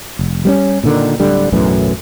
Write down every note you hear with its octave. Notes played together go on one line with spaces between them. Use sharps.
F1
G3 B3 C#4
A#2 D3 D#3
D1 D3 G3
B1 F#2 A2 E3